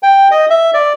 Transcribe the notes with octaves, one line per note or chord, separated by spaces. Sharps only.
G5
D#5
E5
D5